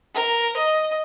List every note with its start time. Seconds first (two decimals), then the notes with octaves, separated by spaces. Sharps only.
0.14 A#4
0.56 D#5